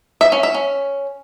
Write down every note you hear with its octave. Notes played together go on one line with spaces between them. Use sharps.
E5
C#4
E5
C#4